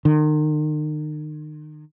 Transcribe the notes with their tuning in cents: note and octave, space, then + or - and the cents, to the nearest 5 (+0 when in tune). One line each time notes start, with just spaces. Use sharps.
D#3 -35